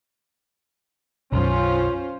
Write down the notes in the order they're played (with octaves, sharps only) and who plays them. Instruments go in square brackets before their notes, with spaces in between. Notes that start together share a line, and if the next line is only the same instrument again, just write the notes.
[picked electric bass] B1 F#2 [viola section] C#4 F4 C5